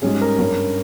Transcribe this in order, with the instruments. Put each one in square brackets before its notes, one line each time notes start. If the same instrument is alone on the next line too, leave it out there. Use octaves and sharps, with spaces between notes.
[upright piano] G#2 G3 C#4 G#4
A#4
G2 G3 C#4